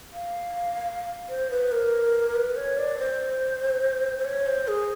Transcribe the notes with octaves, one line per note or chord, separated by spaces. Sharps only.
F5
C5
B4
A#4
B4
C#5
D5
C5
C5
C#5
C5
G#4